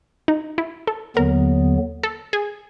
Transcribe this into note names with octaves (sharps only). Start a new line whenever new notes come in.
D#4
E4
A4
D#2 D3 F#3 B3 A#4
A4
G#4